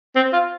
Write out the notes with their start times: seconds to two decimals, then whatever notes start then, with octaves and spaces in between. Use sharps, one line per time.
0.16 C4
0.33 F4